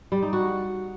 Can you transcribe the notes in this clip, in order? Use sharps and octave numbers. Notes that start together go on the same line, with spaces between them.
G3
D#4
F#4